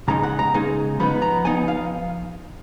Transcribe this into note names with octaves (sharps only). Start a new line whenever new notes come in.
C#3 G#3 D#4 A#5
F#5
A#5
C#3 G#3 D#4
F3 B3 D#4 B5
A#5
F3 B3 D#4 G#5
F5